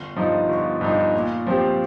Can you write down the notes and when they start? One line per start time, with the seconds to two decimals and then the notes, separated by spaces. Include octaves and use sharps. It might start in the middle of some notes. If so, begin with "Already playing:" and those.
Already playing: G1
0.16 G2 F3 D#4
0.49 G1
0.81 G2 F3 D#4
1.13 A#2
1.47 F3 C4 G4